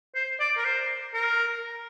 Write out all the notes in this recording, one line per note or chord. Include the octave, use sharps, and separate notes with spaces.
C5
D5
A#4
C5
A#4